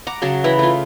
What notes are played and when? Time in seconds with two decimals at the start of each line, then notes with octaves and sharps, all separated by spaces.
0.07 F#5 A#5 D6
0.22 C#3 F#3 A5
0.44 E3 E4 A#5 B5
0.59 A3 F4